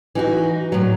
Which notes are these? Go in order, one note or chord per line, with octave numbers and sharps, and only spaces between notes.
E3 D#4 F#4
A2 F#3